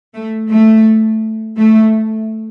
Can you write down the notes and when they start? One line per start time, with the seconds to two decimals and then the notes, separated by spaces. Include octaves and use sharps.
0.14 A3
0.49 A3
1.57 A3